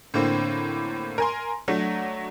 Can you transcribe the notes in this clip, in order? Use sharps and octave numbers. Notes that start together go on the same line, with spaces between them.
A2 D3 A#3 C4
A#4 G#5 C6
F#3 A3 D4